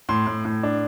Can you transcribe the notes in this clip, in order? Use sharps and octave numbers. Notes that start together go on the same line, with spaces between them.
A2 C6
A2
A2
D4